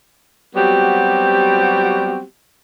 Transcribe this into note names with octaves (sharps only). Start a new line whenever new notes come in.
F#3 G3 B3 C4 F#4 G4